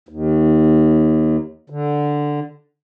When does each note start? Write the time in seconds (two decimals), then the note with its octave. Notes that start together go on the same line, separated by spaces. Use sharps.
0.09 D#2
1.70 D3